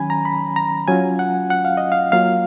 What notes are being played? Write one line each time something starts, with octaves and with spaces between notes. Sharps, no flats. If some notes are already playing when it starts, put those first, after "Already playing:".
Already playing: D#3 F#3 C#4 G#5 B5
A#5
B5
A#5
F#3 C#4 F4 G#5
F#5
F#5
F5
D#5
F5
F#3 A#3 F4 F5